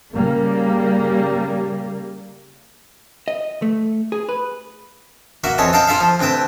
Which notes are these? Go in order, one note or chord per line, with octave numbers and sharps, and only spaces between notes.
C#3 G3 A#3
D#5
A3
G#4
B4
A#3 F#4 E5
F2 E3 C#5 D#5 A5
A4 D#5 F5 G5 A5 A#5
E4 F4 A4 E5 F5
F3
D2 C3 B4 G5 A5